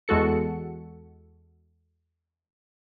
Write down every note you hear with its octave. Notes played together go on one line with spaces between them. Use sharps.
E2 G#3 F#4 A4 C#7